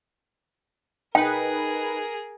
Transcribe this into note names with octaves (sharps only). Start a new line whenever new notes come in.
D#4 G#4 A#4 B4 G5